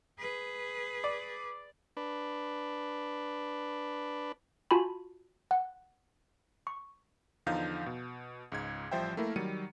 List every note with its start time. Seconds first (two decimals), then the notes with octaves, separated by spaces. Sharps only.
0.19 G#4 B4
1.04 D5
1.97 D4 B4
4.71 F4 F#4 G#5 A5 B5
5.51 F#5
6.67 C#6
7.46 E2 D3 F3 D#4 F5 G6
7.86 B2
8.52 C#2 G#2 G#6
8.91 A1 F3 G3 C5 E5 G5
9.17 A3 A#3 E4 A#4
9.36 D#3 F#3 G3 C#7 D#7